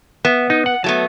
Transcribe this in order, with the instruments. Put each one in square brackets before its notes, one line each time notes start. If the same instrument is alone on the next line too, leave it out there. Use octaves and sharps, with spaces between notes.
[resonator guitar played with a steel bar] B3 [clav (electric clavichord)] E5
[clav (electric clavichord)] D#4
F#5
[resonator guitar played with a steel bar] F#3 A3 B3 [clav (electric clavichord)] A5